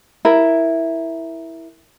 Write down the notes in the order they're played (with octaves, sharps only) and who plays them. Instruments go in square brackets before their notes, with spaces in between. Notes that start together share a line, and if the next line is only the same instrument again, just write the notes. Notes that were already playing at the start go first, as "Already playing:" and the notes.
[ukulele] E4 A#4